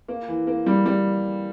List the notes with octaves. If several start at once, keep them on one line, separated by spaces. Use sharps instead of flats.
A#3
E3
A#3
G3
G3